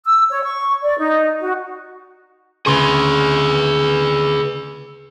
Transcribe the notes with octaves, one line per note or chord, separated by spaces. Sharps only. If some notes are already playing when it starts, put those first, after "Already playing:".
E6
C#5
C#6
D5
D#4
F#4
D2 C#3 G#4 B4 C6